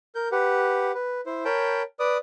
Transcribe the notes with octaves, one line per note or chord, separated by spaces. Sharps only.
A#4 G6
G4 B4 F#5
B4
E4 C5
A#4 C#5 G5 A5 B5 G6
B4 D5 D6 D#6